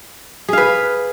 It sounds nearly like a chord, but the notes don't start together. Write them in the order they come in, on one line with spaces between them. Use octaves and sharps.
G#4 F5 B4